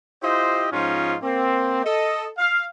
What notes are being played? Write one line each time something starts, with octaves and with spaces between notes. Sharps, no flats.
E4 F4 G4 C5 D#5
G#2 F3 C#4 D#4 F4
A#3 C4
A4 D#5
F5